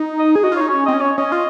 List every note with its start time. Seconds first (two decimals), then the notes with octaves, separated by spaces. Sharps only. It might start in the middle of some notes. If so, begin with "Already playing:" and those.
Already playing: D#4
0.19 D#5
0.35 G#4
0.43 F#4 D#5
0.52 F4
0.56 C#5
0.61 D#4
0.68 C#4 C#5
0.86 C4 D#5
0.93 C#4
1.01 C#5
1.18 C#4 D#5
1.32 F4